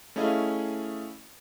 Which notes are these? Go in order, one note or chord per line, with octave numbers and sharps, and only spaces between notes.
A3 C#4 E4 G#4 D#5 F5